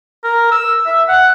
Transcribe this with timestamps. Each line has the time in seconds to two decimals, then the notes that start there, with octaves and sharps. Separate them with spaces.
0.24 A#4
0.51 E6
0.86 E5
1.08 F#5